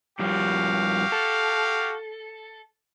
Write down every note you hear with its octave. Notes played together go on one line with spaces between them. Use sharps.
G2 F3 G3 F#4 G4 F5
A4